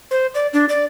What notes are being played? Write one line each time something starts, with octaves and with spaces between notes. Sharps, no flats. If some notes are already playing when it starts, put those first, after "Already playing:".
C5
D5
D4
D5